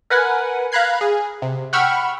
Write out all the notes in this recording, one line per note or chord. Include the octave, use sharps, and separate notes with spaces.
A#4 B4 F#5 G#5
F5 A#5 B5 F#6 G#6 C7
G#4
C3
F#5 G5 B5 C#6 E6 F6